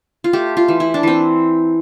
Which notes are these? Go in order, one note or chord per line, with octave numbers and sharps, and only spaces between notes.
F4
A3 G4
F4
E3
E4
D4
E3 C4